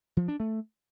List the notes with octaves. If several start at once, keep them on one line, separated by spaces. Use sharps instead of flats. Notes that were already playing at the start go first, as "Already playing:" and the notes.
F3
D4
A3